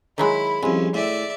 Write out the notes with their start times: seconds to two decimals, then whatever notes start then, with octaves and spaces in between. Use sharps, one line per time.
0.18 D#3 F#3 G#3 E4 B5
0.63 C2 F2 G#3 C#4
0.94 A2 D5 E5